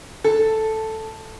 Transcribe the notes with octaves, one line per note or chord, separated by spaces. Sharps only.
A4